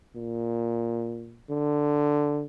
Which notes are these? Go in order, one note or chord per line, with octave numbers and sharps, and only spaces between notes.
A#2
D3